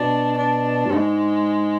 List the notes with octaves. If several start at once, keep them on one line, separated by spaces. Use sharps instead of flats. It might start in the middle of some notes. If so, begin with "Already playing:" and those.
Already playing: B2 D4
D4
G2
G#2 G#3